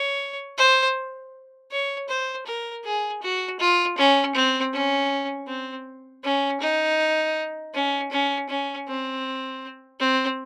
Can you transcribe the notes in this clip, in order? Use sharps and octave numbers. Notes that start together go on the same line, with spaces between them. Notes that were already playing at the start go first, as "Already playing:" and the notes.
Already playing: C#5
C5
C#5
C5
A#4
G#4
F#4
F4
C#4
C4
C#4
C4
C#4
D#4
C#4
C#4
C#4
C4
C4